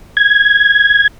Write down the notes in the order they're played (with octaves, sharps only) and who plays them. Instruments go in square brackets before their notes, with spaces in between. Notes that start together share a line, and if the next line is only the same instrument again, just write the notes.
[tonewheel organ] G#6